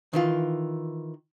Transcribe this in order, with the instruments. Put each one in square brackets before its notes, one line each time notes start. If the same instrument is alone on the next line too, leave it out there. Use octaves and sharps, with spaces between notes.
[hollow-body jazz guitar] D#3 E3 F4